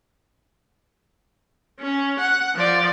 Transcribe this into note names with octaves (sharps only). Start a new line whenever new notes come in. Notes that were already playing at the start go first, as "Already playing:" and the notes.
C#4
F#5
F3 D5